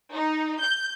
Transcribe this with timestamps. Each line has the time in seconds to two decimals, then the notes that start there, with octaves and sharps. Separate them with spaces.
0.13 D#4
0.61 G6